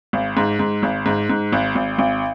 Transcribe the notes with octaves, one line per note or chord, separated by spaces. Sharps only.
G#1
G#2
G#2
G#1
G#2
G#2
G#1
G#1
G#1